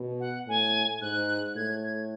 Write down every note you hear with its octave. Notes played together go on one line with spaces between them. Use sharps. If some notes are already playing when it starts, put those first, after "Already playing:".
Already playing: B2
F#5
A2 G#5
G#2 F#6
A2 G#6
G#6